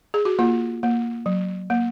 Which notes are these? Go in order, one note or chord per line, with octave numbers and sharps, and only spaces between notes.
G#4
F#4
A#3 F4
A#3
F#3
A#3